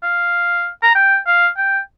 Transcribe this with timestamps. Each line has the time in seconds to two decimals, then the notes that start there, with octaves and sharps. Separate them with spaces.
0.03 F5
0.83 A#5
0.95 G5
1.27 F5
1.57 G5